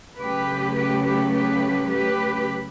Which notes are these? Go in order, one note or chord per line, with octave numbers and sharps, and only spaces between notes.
C#3 F#3 A3 G4 B4
G4 B4
G4 B4
G4 B4
G4 B4